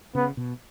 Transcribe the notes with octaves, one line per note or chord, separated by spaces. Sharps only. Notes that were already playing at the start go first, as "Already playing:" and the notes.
C#3 B3
B2